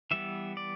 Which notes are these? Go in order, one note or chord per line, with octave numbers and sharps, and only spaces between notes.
E3 G3 B3 E5
D5